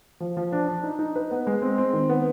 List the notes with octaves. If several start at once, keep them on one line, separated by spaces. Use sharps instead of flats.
F3
F3
D4
D4
D#4
D#4
B4
B3
G#3
C4
C4
D#3
B3